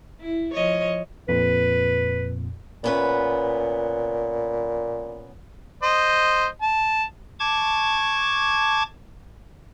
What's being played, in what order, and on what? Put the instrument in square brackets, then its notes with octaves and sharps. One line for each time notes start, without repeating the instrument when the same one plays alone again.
[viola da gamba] E4
F3 C#5 D#5
[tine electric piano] F2 A#2 [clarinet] B4
[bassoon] A#2 [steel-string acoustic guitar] B3 C#4 B4
[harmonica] C5 D#5
A5
[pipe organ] A5 C#6 D6 G#6